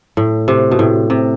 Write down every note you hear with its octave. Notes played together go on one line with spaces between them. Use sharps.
A2
C3
B2
A2
C3